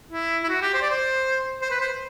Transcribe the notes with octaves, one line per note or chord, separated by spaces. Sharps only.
E4
E4
F#4
G4
C5
D5
C5
C5
B4
C5